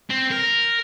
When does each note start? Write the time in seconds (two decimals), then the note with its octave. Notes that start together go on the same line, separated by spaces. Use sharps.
0.10 C4
0.31 A#4